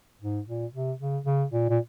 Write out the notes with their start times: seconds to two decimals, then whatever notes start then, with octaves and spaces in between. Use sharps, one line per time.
0.22 G#2
0.47 A#2
0.74 C3
1.00 C#3
1.26 C#3
1.52 A#2
1.70 A#2